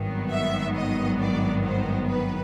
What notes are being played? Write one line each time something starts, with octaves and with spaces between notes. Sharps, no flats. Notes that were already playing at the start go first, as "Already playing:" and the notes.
Already playing: G#1 G2 D#3 F#3 B3
E5
D#5
D5
C5
B4